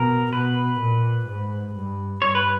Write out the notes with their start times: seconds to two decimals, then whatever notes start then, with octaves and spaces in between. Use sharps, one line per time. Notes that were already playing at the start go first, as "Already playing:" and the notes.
Already playing: B2 A#4
0.32 B2 B4
0.81 A#2
1.27 G#2
1.75 G2
2.22 G2 C#5
2.35 B4